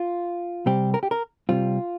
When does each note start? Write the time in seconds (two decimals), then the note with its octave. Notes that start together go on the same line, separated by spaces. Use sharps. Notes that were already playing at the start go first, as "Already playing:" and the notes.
Already playing: F4
0.66 C3 G3 C4 G4
0.94 A#4
1.03 G4
1.11 A#4
1.49 C3 G3 C4 F4